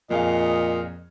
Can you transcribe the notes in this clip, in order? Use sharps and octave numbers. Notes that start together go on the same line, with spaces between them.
F2 A#2 G#4 D#5 F5